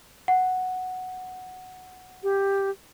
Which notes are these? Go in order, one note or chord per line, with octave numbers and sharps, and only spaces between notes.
F#5
G4